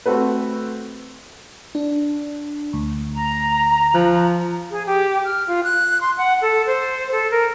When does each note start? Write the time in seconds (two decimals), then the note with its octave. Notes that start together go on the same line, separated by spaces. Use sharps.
0.06 A3 C4 F#4 A4 B4
1.75 D4
2.73 D2
3.15 A#5
3.95 F3 F#6
4.71 G#4
4.87 G4
5.25 F6
5.47 F4
5.64 F#6
6.01 C6
6.18 F#5
6.42 A4
6.67 C5
7.12 A4
7.31 A#4